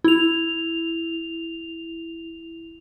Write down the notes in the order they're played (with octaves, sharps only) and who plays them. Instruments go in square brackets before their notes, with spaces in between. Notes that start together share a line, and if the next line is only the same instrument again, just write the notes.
[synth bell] E4 F7